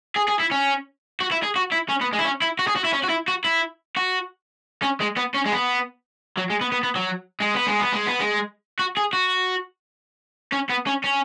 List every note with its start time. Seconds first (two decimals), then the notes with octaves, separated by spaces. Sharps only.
0.16 G#4
0.28 G#4
0.40 E4
0.52 C#4
1.20 F#4
1.31 E4
1.43 G#4
1.56 F#4
1.72 E4
1.89 C#4
2.01 B3
2.13 G#3
2.19 E4
2.24 C#4
2.42 E4
2.59 F#4
2.68 G#4
2.76 F#4
2.85 E4
2.93 C#4
3.04 F#4
3.10 E4
3.28 F#4
3.44 E4
3.96 F#4
4.82 C#4
5.00 G#3
5.17 B3
5.34 C#4
5.45 G#3
5.52 B3
6.37 F#3
6.50 G#3
6.61 B3
6.72 B3
6.83 B3
6.96 F#3
7.41 G#3
7.55 B3
7.67 G#3
7.80 B3
7.93 G#3
8.07 B3
8.20 G#3
8.79 F#4
8.97 G#4
9.13 F#4
10.52 C#4
10.69 B3
10.87 C#4
11.04 C#4